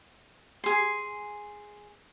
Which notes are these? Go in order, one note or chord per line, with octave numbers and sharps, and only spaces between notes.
G#4 C6